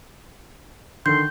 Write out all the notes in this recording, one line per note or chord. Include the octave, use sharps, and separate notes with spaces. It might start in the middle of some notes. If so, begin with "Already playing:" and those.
D3 D#3 A4 C6 G6